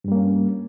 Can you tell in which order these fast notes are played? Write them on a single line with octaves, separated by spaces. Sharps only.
G2 G3 A#3 C#4